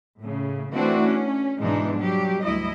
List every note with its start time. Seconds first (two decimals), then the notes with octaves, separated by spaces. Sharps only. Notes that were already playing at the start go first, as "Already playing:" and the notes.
0.19 A2 C#3
0.73 E3 A3 C4 D4 E4 F#4
1.06 C#4
1.59 G#2 B2 E3 G#3 D4 D#4
2.00 F#3 G3 G4
2.43 D2 E4 D#5